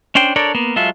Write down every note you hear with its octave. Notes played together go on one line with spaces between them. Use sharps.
C#4 D4 C5 G5
D4 A4 A#4 C#5 D5
A#3 B3
F#3 G#3 F4 A4 E5